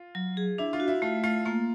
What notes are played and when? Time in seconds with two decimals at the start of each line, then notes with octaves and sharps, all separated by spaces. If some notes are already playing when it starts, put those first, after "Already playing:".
Already playing: F4
0.15 F#3
0.37 G#4
0.58 D4 E4
0.73 F4
0.80 F#4
0.88 E4
1.02 A3 F4
1.24 A3 F4
1.45 A#3 F4